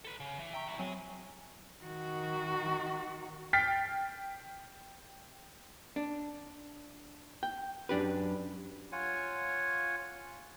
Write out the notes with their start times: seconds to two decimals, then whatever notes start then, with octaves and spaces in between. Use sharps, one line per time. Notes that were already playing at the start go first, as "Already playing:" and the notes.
0.05 A4 B4
0.20 C#3
0.39 E3
0.53 E5 G5 A#5 C#6
0.67 C2 E3
0.79 F#3 G#3 C4 G#4
1.83 D#3 F#4
3.53 G5 F6 A6 B6 C7
5.96 D4
7.43 G5
7.89 F#2 D4 G4 B4
8.92 F4 C#5 F#5 G#5